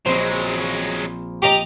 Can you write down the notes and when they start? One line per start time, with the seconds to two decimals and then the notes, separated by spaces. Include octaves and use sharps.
0.05 A#1 F#3 G#3 C4 C5
1.42 G4 D#5 A#5 D6